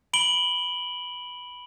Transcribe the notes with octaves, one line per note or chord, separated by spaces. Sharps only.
B5 D7 F#7 G7